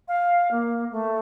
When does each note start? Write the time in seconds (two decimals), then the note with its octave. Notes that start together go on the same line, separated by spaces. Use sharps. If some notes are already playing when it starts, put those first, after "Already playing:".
0.08 F5
0.51 A#3
0.91 A3